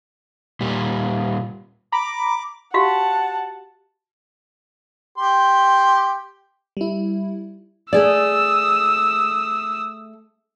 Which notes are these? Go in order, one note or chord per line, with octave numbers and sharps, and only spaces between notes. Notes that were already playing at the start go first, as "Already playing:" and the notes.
A#2 G3
A#5 B5 D6
F#4 G4 F5 F#5 A5
G4 C6
G3 E4
A3 G#4 D5 D#6 E6